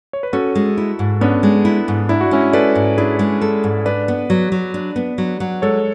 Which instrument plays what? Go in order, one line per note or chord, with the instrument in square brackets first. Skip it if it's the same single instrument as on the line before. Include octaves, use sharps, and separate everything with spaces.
[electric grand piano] C#5
B4
[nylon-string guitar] C#4 [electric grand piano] F#4 A4
[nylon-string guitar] G#3
E4
G#2
[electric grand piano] B3 D4 [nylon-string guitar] C#4
[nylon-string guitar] G#3
E4
G#2
[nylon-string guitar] D4 [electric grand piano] E4
[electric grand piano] F#4
[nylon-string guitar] G#3 [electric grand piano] C#4 E4
[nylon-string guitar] A4 [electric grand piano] B4 D5
[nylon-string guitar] G#2
[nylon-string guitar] D4 [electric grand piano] E4 G#4
[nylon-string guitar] G#3
A4
G#2
[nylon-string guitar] D4 [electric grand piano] B4 D5
[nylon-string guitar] B3
F#3
F#3
D4
B3
F#3
F#3
[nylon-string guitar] G#3 [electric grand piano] A4 C#5